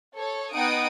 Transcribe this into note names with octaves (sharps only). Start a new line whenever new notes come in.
A4 C#5
B3 D#4 F#5 G5 D#6 D7